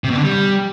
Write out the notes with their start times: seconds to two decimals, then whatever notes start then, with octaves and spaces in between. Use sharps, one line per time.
0.04 C3
0.10 B2
0.17 D3
0.23 G3